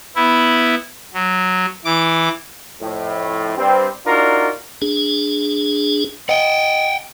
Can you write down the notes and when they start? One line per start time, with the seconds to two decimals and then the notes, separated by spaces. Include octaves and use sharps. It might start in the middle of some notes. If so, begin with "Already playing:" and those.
0.16 B3 E4
1.14 F#3
1.85 E3 D6
2.81 F2 A2
3.57 G2 G3 C4
4.07 D4 D#4 F4 F#4 A#4
4.82 D4 G#4
6.29 D#5 F#5 G5